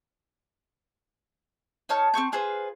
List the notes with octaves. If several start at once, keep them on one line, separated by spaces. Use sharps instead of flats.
D#4 C#5 A5 F6
C4 A4 C#6 G6
F4 G#4 B4 C5